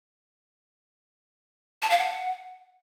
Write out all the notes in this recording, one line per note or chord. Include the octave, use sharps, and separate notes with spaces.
A5
F5
F#5